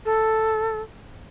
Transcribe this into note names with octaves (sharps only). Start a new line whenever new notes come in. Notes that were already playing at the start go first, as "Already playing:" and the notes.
A4